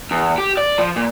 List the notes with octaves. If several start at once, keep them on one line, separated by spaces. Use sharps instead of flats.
E2
G4
D5
F3
A#2